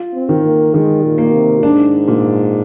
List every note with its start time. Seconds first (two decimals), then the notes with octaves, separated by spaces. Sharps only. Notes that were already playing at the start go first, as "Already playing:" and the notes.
Already playing: F4
0.13 C4
0.29 D#3
0.44 A#3
0.74 D#3 G#3
1.03 A#2
1.18 A#3
1.33 C3
1.63 G#2 D4
2.08 A#2